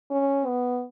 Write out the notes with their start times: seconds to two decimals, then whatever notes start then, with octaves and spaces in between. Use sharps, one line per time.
0.11 C#4
0.47 B3